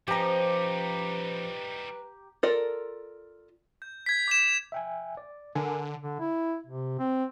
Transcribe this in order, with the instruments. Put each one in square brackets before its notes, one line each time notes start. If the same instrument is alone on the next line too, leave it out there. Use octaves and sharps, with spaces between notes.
[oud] F3 C#4 [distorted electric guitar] G3 D#4 [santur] G4 A#5 [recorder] B4
[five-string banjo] F4 A4 A#4 D5
[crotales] G6
G#6 B6
D6 G#6 E7
[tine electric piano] E5 G5 G#5
D5
[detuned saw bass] D3 [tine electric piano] A#4 G#5
[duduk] D3
E4
C3
C4